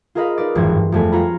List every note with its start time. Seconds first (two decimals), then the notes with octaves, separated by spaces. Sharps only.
0.15 F4 G#4 A#4 D#5 F5 B5
0.38 D#4 B4 D5
0.55 G#1 F2 E3 C#4 C6 G#6
0.69 G2
0.92 F2 G3 A3 B3 G#5 B5
1.12 F4 F#4 C#5 A#5 B5